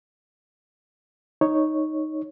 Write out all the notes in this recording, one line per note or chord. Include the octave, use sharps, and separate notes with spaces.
D#4 C#5